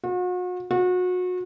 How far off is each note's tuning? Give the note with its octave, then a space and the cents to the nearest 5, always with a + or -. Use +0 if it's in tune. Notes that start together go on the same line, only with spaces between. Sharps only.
F#4 -40
F#4 -30